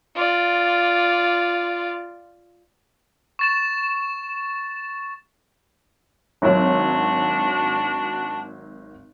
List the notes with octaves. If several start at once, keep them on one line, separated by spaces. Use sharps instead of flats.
F4 D5
C#6 A6 E7
G#1 F#3 D4 F#4